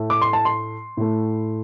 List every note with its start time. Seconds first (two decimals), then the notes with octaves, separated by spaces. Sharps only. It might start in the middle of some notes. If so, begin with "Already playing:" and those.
Already playing: A2 A3
0.10 D6
0.22 C6
0.33 A5
0.45 C6
0.97 A2 A3